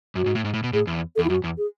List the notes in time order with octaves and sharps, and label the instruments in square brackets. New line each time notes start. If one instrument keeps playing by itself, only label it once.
[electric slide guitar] F#2 [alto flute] F#4
[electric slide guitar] G#2
A2
G#2
A2
B2
[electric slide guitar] A2 [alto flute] G#4
[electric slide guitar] E2
[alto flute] A4
[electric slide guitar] E2
[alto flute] E4
[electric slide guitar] F#2 [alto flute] F#4
[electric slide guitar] E2
[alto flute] G#4